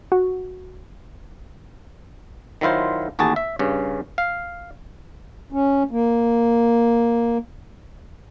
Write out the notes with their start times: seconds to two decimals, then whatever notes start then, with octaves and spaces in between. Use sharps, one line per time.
0.12 F#4
2.61 D#3 F#3 E4 F4 C5
3.19 A1 D#2 F#4 G#4 A5
3.36 E5
3.59 G2 C#3 C#4
4.18 F5
5.52 C#4
5.91 A#3